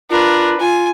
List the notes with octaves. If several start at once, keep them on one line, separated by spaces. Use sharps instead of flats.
D4 F4 A#4 B4
F4 G#5